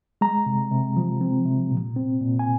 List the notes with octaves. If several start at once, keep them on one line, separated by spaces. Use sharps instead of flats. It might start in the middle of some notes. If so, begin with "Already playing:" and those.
G#3 A#5
C3
C3
F3
C4
C3
A#2
C4
A#2
G#5